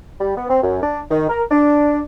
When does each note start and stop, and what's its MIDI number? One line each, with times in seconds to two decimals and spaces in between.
0.20 0.32 55
0.37 0.47 59
0.50 0.60 60
0.63 0.81 42
0.83 1.00 62
1.11 1.26 51
1.29 1.43 70
1.50 2.00 62